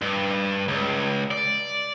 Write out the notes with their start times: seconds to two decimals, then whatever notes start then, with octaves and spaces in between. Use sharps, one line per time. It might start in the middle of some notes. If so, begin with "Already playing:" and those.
0.02 G2
0.68 C#2
1.31 D5